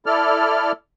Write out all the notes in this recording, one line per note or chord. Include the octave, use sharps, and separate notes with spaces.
E4 A4 D5 F6